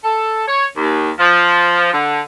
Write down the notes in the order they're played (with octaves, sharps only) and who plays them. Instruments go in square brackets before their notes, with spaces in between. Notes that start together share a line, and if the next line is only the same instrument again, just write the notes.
[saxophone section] A4
C#5
D#2
F3
D3